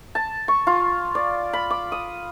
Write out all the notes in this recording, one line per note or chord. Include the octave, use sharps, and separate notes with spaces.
A5
C#6
F4
D5
B5
D6
D#6